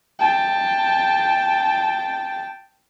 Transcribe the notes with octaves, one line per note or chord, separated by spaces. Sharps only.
G5 A5